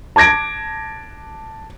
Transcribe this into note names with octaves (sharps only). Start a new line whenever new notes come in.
A5 D6 G#6 A#6 D7